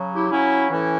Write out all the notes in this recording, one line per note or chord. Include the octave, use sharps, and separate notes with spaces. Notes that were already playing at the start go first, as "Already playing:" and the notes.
Already playing: C#3 F#3
E4 G4
C#3 F#3 C#4 E4
A2 E3 C#4 E4